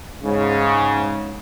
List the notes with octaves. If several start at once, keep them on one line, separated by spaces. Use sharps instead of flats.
G#2 C#3